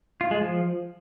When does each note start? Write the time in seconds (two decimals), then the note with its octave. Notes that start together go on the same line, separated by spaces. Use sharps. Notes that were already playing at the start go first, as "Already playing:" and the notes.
0.21 F4
0.31 G#3
0.41 F3